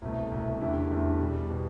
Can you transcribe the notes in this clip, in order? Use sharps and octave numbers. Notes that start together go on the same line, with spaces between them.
C2 B2 A3
C2 B2 A3
E2 D3 A3 E4 G4
E2 D3 A3 E4 G4
E2 B2 G3
B2 G3